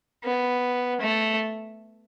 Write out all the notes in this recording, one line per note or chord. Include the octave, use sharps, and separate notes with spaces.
B3
A3